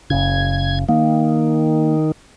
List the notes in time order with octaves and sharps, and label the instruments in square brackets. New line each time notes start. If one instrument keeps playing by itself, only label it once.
[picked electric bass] F#1 C#3 [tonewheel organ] G#6
[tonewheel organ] D#3 [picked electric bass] A#3